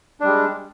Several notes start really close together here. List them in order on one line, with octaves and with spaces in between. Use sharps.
D4 G3 G#3